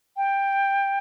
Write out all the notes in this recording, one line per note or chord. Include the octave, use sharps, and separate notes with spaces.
G5